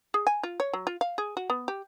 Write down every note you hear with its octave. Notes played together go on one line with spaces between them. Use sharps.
G#4
G#5
F4
C#5
F#3
F4
F5
G#4
F#4
B3
G4